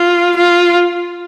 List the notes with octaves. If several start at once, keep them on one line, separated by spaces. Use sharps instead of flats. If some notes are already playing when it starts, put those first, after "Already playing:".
Already playing: F4
F4